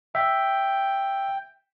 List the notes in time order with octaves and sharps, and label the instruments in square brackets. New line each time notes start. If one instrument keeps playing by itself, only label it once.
[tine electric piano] E5 [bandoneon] G5